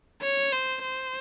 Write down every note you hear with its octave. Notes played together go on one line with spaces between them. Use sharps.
C#5
C5
C5